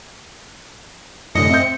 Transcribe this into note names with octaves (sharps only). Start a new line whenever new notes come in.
F1 F#2 A2 D3 D#5 C#7
C4 E5 G6